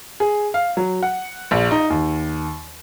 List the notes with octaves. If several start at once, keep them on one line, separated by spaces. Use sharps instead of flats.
G#4
F5
F#3
F#5
A#1
D#4
D#2